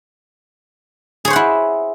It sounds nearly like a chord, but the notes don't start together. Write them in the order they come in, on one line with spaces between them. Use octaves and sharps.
G#4 C#5 C5 F#5 E4